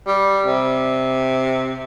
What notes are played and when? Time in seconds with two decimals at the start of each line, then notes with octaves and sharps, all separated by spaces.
0.07 G3
0.46 C3